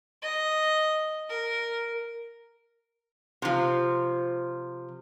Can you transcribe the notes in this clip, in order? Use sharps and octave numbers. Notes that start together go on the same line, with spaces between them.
D#5
A#4
C3 F3